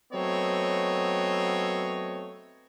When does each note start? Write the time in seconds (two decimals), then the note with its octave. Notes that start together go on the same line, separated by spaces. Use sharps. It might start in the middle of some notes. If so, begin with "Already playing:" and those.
0.13 F#3 A3 B3 C4 C#5 D#5